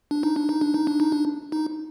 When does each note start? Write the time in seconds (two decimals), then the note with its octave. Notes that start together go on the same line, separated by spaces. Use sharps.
0.11 D4
0.23 D#4
0.36 D4
0.49 D#4
0.61 D4
0.74 D#4
0.87 D4
1.00 D#4
1.12 D4
1.52 D#4